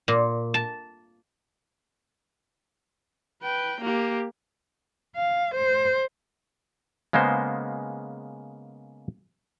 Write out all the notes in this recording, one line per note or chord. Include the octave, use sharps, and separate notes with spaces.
A#2
A5
B4 G5
A#3 G4
F5
C5
C#3 G#3 A#3 B3 C5